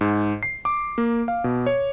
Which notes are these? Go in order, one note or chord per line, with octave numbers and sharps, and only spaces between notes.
G#2
C7
D6
A#3
F5
B2
C#5